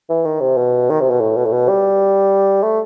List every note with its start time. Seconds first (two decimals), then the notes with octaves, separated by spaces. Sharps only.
0.09 E3
0.25 D#3
0.40 C3
0.57 B2
0.90 D#3
1.01 C3
1.10 B2
1.20 A2
1.36 B2
1.45 A2
1.52 B2
1.68 G3
2.63 A3